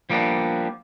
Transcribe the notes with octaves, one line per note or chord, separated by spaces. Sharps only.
F3 G3 A#3 B3 D4